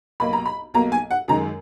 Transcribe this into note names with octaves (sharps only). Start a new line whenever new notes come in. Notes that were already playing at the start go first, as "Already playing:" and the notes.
B1 B2 A#3 B5
A#5
B5
B1 B2 A#3 A#5
G#5
F#5
F#2 D#3 G#3 A#5